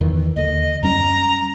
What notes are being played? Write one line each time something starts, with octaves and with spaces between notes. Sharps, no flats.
E2 D#3 E3
D#2 D3 D#5
F#2 G3 C#4 A#5